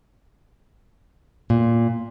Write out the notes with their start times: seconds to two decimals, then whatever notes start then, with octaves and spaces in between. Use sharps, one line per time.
1.50 A#2